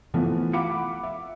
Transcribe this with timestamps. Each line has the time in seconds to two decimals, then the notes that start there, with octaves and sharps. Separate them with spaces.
0.14 E3 F3 A3 B3 F4
0.53 F5 F#5 B5 D6 C#7
1.03 E5